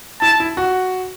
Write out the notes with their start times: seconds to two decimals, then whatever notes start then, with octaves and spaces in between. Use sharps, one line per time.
0.21 E4 A5
0.40 E4
0.57 F#4